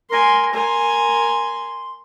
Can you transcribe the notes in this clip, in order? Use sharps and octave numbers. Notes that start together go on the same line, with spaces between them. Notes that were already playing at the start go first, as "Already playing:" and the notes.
A#4 G#5 C6
A#4 G#5 C6